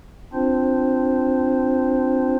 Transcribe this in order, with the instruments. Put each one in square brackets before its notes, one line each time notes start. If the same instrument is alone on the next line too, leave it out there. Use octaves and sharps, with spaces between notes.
[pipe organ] C4 D4 F4 C5